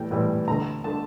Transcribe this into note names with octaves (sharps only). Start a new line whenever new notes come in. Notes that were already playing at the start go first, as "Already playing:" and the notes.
Already playing: A2 E3 G3 G5
A2 E3 G3
D2 D3 A3 A#5
D3 A3 A5